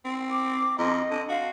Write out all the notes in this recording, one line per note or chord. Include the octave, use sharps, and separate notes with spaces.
C4
D6
F2 D#5
D3
F#4 F5